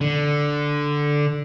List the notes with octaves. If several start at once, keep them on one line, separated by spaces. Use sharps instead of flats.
D3